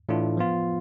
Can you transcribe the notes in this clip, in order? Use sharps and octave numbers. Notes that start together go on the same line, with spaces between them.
A2 E3 A3 D4 F4
F3 B3 F4